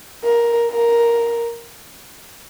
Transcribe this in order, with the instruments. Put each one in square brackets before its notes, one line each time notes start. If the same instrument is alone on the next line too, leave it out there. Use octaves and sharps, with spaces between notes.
[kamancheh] A#4
A#4